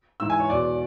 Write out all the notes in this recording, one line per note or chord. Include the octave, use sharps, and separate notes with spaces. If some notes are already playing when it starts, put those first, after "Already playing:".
G#2 E3 E6
G#5
C#5
E2 B2 D5